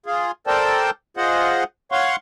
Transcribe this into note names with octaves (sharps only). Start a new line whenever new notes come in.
F4 G#4
A4 A#4 C5 D5 G5 A5
F4 G#4 C5 D#5 F#5
C#5 F5 F#5 C6 C#6